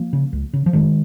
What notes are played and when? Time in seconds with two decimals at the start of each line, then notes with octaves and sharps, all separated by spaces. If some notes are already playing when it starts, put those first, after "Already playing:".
Already playing: F3 A#3
0.13 C#3
0.33 C#2
0.53 C#3
0.66 F3
0.73 F1 D#3 G#3